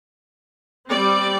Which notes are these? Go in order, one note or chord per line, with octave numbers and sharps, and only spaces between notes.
G3 C4 D5